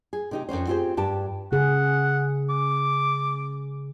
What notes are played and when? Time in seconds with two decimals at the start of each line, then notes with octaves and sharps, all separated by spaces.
0.13 G#4
0.31 C3 D#4 G4
0.49 F2 C3 C#4 C5
0.67 C4 F4 G4 G#4 C5
0.97 G2 G4 A5
1.52 C#3 G#4 F#5
2.50 D6